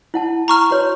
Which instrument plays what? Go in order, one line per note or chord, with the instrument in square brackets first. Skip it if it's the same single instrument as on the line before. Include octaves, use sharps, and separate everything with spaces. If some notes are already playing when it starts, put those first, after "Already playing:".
[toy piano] E4 F#5 A5
[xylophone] A#5 C#6 F6
[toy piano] F#4 B4 C#5